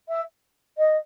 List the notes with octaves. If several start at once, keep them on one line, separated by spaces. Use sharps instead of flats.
E5
D#5